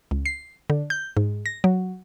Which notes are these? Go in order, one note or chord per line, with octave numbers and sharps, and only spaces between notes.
C#2
C7
D3
G6
G#2
A#6
F#3